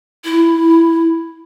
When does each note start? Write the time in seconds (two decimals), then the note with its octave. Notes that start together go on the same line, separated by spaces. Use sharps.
0.25 E4